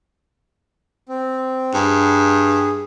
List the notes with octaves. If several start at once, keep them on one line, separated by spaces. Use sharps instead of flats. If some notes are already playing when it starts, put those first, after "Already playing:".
C4
G2 G#4